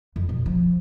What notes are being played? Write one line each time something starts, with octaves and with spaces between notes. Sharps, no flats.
F2
B2
F3